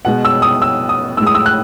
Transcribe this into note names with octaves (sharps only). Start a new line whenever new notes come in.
B2 G#3 F#5
E6
D#6
E6
D#6
A2 G#3 E6
D#6
E6
F#6